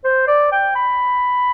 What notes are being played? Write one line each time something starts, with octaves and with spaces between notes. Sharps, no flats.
C5
D5
G5
B5